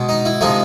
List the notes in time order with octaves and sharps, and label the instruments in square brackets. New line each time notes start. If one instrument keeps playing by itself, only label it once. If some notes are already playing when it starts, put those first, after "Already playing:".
Already playing: [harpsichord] B2 G#3
D#4
E4
C3 F3 G#3 D#4